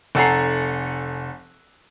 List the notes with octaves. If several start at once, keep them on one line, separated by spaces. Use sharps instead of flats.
F1 A4 F#5 G#5 A#5 C7